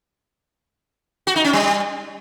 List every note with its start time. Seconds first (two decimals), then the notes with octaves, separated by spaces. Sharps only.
1.27 F#4
1.36 D#4
1.44 C#4
1.53 G3